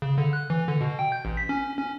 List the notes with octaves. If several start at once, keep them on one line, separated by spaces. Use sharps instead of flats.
C#3
D3
F#6
E3
D3
B2
G5
G6
A1
B6
C#4
C#4